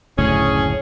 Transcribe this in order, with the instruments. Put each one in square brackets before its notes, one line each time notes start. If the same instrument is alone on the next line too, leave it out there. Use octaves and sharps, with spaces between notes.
[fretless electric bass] F#1 D2 A2 [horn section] C#4 G#4